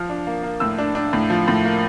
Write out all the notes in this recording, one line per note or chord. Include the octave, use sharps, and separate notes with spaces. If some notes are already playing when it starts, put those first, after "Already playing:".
Already playing: F3 F6
D4
A#3
A#3
A2 E6
D4
D4
A2
F3
A2
A#3